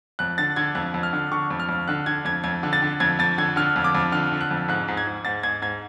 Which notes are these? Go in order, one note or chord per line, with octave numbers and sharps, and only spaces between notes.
F2 F#6
D3 A6
D3 G#6
F2 F#6
F2
F6
D3
D3 C#6
F2
F6
F2
D3 F#6
D3 G#6
F2 G#6
F2 G#6
D3
A6
D3
F2 G#6
F2 A6
D3 G#6
D3 F6
F2
D6
F2
D3 F6
D3
F#6
F2
G#2 F#6
G#2
G#6
G#2
G#2 A6
G#2 G#6
G#2 G#6